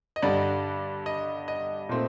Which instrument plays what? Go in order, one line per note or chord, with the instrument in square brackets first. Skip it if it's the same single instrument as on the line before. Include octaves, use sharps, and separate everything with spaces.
[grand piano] D#5
G2 D3 G3 D4 D5
D#5
D#5
A#2 A3 C4 D#4